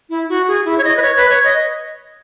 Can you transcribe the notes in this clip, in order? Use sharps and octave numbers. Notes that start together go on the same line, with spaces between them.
E4
F#4
G#4
E4
C#5
D#5
B4
C#5
B4
C#5
D#5